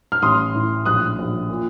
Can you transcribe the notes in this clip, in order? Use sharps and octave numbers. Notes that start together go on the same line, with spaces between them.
F6
A1 C6 D#6
A2
A#1 D#6 F#6
A#1
A#2